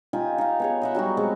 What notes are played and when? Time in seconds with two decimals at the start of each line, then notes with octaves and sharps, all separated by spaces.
0.13 D#4 F4 G4 G#5
0.38 D#4 F5
0.60 B3 G#4 C#5
0.82 D#5 E5 F#5
0.95 F#3 G3 D#4 F#4
1.17 G#3 B3 C4 C#6